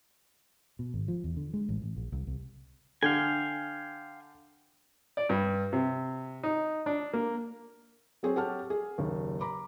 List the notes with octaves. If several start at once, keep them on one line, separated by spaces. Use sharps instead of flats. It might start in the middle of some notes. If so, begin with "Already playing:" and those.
B2
G#1
F3
E2
D3
G#3
A1
A1
A#1
C2
C2
D3 F5 G5 G#5
D5
G2
C3
D#4
D4
A#3
F#3 C4 G#4 C#5
G4 A4 C#5 F#5 A5 F6
G#4
F#1 D#2
A#5 B5 D6